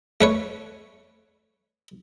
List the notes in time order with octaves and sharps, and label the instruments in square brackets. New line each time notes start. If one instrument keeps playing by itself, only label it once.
[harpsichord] A3 B4 C#5